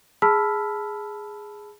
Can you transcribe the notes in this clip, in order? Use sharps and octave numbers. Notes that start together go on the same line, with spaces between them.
G#4 A5 B5 E6 F6 B6